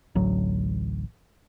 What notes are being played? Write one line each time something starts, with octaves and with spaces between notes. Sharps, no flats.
A1 D2 F#3